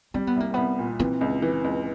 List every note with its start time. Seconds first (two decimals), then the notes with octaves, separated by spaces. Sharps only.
0.14 G3 C4
0.27 B3
0.36 C2 A#3
0.54 C2 B3
0.79 A#2
1.00 E3 C4
1.21 C#2
1.42 E3
1.64 C#2